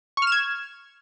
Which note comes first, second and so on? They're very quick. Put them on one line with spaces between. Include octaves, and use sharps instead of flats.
C#6 F6 E7 G#6